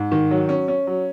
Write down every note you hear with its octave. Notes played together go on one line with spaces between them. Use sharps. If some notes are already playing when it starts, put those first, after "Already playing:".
Already playing: G#2
D#3
F#3
C#4
C#4
F#3